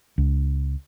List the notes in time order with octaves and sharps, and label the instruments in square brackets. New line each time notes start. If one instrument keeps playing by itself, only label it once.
[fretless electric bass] C#2